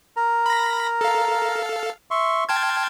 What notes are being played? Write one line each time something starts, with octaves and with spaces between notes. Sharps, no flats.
A#4 A#5
B5 A#6
A4 F5
E5 C6 C#6
G5 A5 C6 F6 G#6